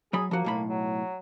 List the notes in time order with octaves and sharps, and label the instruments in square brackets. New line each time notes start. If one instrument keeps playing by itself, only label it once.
[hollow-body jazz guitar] F#3 B5 [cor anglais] G#4
[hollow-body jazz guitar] F3 F#4 [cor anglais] A#3
[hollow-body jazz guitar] B1 A2 B5
[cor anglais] F#3